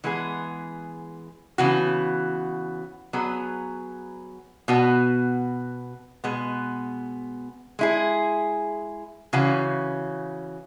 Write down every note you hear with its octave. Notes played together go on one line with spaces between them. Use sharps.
E3 G#3 B3 G#4
C#3 E3 B3 F#4
F#3 B3 G#4
B2 B3 F#4
B2 G#3 B3
G#3 E4 G#4
C#3 E3 C#4 F#4